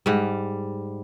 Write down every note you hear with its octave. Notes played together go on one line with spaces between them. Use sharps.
G#2 G3